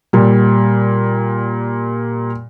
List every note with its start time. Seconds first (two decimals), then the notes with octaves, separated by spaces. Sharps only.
0.13 A#2 G3